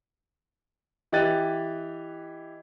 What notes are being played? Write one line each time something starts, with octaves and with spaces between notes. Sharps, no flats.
E3 G4 D#5 F#6 A6 D#7